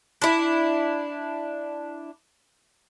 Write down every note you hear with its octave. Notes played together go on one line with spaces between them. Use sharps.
D4 E4